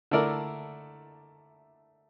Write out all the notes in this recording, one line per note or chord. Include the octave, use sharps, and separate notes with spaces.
D3 A3 E4 A#4 D5